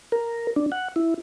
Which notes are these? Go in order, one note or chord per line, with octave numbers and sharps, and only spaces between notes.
A#4
D4
F#5
E4